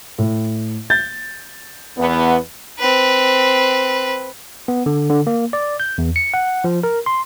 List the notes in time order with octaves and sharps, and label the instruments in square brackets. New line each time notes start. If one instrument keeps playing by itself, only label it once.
[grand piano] A2
G6 A6
[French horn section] E2 B3
[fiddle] C4 B4
[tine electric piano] B3
D3
D3
A#3
D5
G6
E2
C#7
F#5
F3
A#4
C6